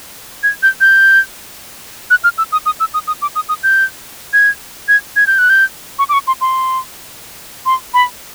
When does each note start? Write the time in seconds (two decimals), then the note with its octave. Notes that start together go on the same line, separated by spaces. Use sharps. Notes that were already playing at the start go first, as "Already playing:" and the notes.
0.43 G#6
0.63 G6
0.81 G6
2.10 F#6
2.24 F6
2.38 E6
2.52 D#6
2.66 D#6
2.80 E6
2.94 D#6
3.07 D#6
3.22 D6
3.35 D#6
3.49 D#6
3.63 G6
4.33 G#6
4.88 G#6
5.16 G#6
5.27 G6
5.39 F#6
5.50 G6
5.99 C#6
6.09 D6
6.13 C#6
6.27 C6
6.41 C6
7.66 C6
7.94 B5